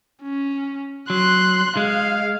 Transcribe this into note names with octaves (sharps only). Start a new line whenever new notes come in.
C#4
F#3 C6 F#6
G#3 F5